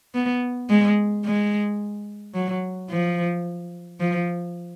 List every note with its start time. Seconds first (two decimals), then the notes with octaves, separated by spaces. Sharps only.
0.14 B3
0.70 G#3
1.25 G#3
2.35 F#3
2.90 F3
4.00 F3